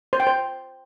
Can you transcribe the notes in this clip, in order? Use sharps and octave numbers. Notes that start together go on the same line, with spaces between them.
C5
G5
C5